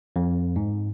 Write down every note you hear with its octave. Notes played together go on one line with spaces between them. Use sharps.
F2
G#2